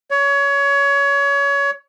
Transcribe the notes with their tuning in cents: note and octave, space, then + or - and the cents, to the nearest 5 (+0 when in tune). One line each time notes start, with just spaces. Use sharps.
C#5 +25